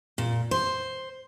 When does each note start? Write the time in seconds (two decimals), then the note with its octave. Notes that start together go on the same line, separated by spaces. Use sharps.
0.18 A#2
0.51 C5